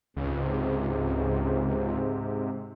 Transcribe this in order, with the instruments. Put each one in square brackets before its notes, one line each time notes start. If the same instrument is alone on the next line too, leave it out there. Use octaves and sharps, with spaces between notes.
[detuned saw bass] C#2 [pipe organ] G#2 C3